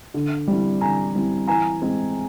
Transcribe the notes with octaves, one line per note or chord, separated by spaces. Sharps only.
D3
G3 C4 E4
D3 G#5 A#5
G3 C4 E4
E3 G#5 A#5
G#3 C4